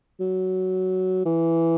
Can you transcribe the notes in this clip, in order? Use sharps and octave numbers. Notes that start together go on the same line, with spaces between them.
F#3
E3